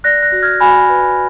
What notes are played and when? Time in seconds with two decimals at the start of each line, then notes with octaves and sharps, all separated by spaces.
0.04 D5 F#6 A#6
0.22 F#6 A#6
0.32 F#4
0.42 F6 G#6
0.60 F#4 G#5 B5
0.89 B4